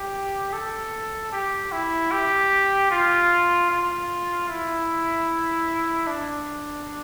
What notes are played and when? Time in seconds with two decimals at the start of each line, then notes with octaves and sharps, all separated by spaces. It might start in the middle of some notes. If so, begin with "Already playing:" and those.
Already playing: G4
0.53 A4
1.32 G4
1.72 E4
2.11 G4
2.91 F4
3.70 F4
4.49 E4
6.07 D4